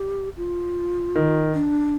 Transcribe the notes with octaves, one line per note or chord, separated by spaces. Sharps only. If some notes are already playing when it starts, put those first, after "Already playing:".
Already playing: G4
F4
D#3
D4